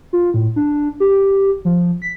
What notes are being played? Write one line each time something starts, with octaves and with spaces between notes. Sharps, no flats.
F4
A2
D4
G4
F3
B6